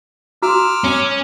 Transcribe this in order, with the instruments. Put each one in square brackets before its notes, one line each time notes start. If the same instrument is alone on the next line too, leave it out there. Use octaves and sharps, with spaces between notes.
[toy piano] F#4 [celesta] A#5 C6 [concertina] D6 E6 F6
[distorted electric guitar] C#4